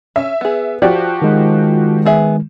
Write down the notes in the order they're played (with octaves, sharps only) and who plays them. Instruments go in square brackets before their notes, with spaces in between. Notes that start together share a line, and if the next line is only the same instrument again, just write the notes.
[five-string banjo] C#4 [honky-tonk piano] E5
[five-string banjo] B3 G#4
[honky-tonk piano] F3 F#4 G4 [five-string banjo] D5
[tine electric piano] D#3 G#3
[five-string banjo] B3 G#4 E5